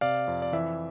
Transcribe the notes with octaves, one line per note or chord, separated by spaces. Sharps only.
C3 D5 F5
F2
D5
E3 E5